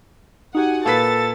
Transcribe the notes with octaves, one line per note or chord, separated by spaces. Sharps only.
D#4 F#4 G4 F#5 G#5
A#2 A4 B4 F5 A6 B6